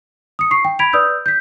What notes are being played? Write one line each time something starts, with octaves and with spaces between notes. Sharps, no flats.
D#6 C#7
C#6 C7
G5
B5 G#6 B6 D7 F7
B4 D5 D#6 E6 G6
G6 B6